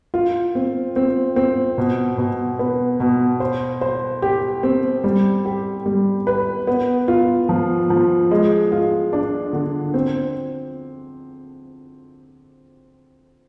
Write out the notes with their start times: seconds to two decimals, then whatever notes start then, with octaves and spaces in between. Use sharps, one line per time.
0.14 F4
0.55 C4
0.96 C4
1.36 C4
1.78 B2
2.18 B2
2.59 B3
3.00 B2
3.40 C5
3.81 C5
4.22 G4
4.63 C4
5.04 G3
5.45 G4
5.86 G3
6.27 B4
6.67 B3
7.08 F4
7.49 F3
7.90 F3
8.31 G#3
8.72 F4
9.13 D4
9.53 D3
9.94 C4